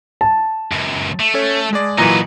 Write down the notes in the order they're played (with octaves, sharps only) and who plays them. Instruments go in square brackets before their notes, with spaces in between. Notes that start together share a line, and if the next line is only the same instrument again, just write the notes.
[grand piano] A5
[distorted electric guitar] C#2 F#2
A3
[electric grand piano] C#4 A4 C#5
G#3 G#4 D5
[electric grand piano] A#2 E3 F#3 [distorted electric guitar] D#4 B4 [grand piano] A#5